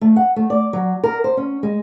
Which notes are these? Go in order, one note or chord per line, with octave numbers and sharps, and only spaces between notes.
A3
F#5
A3
D5
F#3
A#4
C5
C#4
G#3